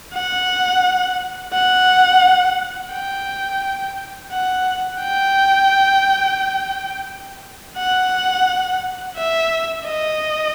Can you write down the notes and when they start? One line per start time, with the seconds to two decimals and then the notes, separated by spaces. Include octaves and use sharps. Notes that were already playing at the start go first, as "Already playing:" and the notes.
0.14 F#5
1.53 F#5
2.92 G5
4.31 F#5
5.01 G5
7.78 F#5
9.16 E5
9.86 D#5